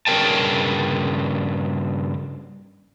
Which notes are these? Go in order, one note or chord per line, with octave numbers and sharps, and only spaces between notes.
G2 C#3 F4 A#4 G5 A5